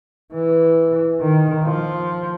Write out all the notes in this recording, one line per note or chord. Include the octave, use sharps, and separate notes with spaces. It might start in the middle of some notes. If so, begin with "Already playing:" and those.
E3
D#3
F3